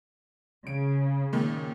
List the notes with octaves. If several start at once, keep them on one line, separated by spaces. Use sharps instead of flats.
C#3 D7
A#2 D#3